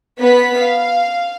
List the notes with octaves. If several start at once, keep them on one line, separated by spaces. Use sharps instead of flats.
B3 B4 B6
F5